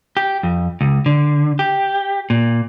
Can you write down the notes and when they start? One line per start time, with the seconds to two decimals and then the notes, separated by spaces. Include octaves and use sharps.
0.17 G4
0.43 F2
0.81 C#2
1.06 D3
1.59 G4
2.30 A#2